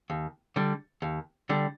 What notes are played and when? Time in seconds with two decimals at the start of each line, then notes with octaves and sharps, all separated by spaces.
0.10 D#2
0.56 D3 G3
1.02 D#2
1.49 D3 G3